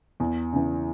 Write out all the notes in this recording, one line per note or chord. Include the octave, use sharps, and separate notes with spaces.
E2
C#3 E3